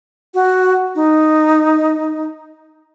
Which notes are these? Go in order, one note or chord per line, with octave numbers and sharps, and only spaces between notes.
F#4
D#4